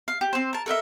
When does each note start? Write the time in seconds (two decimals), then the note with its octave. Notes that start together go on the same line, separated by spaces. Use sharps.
0.08 F5
0.21 G4
0.33 C4 C5
0.53 A#4 A5
0.66 A4 A#4 D#5 E5